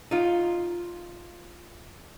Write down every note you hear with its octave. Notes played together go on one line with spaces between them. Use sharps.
D#4 F4